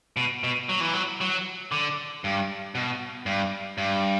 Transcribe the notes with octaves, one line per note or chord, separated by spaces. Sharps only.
B2
B2
F#3
E3
F#3
F#3
D3
G2
B2
G2
G2